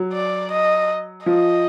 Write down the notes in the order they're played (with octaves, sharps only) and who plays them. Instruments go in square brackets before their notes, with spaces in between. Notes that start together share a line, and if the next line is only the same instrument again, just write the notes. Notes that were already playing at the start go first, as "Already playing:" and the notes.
Already playing: [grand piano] F#3
[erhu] D5
D#5
[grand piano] F3 [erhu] D#5